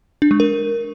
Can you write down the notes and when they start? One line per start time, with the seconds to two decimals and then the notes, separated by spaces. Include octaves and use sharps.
0.22 D4
0.31 G#3
0.40 A#4